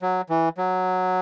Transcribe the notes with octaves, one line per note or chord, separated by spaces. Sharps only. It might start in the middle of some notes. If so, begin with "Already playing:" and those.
F#3
E3
F#3